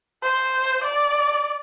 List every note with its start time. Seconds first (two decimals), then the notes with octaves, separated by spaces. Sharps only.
0.22 C5
0.84 D5